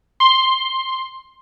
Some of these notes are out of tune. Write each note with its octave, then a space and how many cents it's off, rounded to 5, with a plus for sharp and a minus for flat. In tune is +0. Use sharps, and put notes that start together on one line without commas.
C6 +5